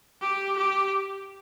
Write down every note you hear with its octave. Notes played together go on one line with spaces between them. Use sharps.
G4
G4